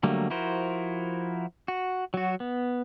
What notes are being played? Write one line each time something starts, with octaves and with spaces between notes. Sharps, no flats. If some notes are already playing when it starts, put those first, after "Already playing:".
D3 F#3 G3 A3 A#3
F3 E4 F#4 A#4 C5
F#4
F#3 F#4
B3